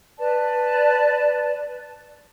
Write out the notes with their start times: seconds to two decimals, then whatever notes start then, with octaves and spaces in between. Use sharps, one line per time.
0.18 B4 D5 A5